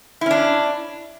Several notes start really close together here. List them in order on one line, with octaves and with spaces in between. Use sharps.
E4 C#4 D4